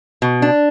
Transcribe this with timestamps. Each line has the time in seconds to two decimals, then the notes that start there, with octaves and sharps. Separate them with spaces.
0.22 B2
0.42 D4